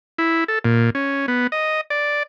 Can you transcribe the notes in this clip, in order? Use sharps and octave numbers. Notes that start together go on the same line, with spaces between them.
E4
A4
A#2
C#4
B3
D#5
D5